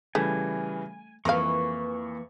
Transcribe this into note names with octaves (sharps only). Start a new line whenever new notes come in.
C#3 E3 G3 A3 G#5
F2 E3 A#3 A#4 B4 F5 C#6